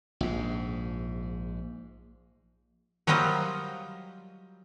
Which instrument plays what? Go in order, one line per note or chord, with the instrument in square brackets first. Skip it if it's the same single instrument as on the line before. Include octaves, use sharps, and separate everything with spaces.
[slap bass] A#1 G#2
[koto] F#3 G3 A#3 F4 C5 D#5